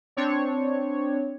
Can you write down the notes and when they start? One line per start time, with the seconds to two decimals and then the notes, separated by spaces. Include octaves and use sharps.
0.17 C4 D4 C#5